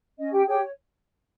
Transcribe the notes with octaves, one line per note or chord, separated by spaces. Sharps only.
C#4 D#5
G4 G5
G4 G#4 C#5 G5